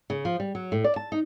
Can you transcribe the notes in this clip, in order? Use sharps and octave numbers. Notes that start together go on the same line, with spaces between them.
C#3
F3
G3
F#3
A2
D5
A5
D#4